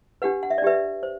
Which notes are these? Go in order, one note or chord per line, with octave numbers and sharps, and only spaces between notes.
D4 G4 B4 F#5
F#5
E5
D5
D4 G4 B4 E5
C5